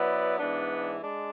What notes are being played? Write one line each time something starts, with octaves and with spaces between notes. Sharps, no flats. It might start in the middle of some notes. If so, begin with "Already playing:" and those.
Already playing: F#3 B3 E4 B4 D5
G#2 E3 B3 D4
G#3 D4